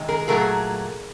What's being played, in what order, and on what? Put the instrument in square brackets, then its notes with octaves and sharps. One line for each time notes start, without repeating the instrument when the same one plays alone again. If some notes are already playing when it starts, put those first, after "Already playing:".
Already playing: [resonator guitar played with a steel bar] C3 D#3 G#3
G#4 A#4
A#2 F#3 A3 G#4 A#4